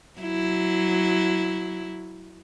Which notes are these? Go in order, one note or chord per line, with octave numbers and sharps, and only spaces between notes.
F#3 E4